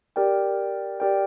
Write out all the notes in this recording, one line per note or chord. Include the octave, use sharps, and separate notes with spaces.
G4 A#4 D5 G5
G4 A#4 D5 G5